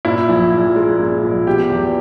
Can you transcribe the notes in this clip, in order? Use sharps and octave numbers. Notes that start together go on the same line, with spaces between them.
A#2 E4
A#1
A#1
G#3
A#2
A#1
B2 G4
E2